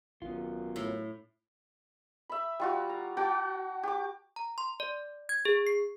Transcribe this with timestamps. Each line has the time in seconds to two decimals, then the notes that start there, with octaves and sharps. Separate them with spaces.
0.22 G#1 F#2 B3 F4
0.76 A2
2.29 E5 B5
2.60 G3 F4 F#4
2.89 A#5
3.17 F#4 F#5 G5 A5
3.83 G4 D6
4.36 A#5
4.58 C6
4.80 D5
5.29 G#6
5.45 G#4
5.67 C7